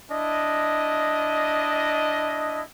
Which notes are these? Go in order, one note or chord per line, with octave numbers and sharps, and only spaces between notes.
D4 E4 D#5